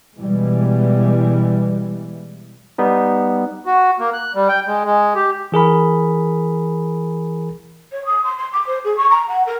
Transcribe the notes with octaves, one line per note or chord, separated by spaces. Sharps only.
B2 E3 G3 G#3
G3 B3 D#4
F#4
A#3
F#6
G3
G5
G#3
G#3
G4
E3 G#4 A#4 B5
C#5
D#6
C6
C6
D6
C5
G#4
C#6
A#5
F#5
A#4